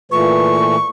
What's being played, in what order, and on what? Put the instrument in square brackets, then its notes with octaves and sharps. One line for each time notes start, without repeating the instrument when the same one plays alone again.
[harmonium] A#2 E3 A3 [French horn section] F4 B4 [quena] C#6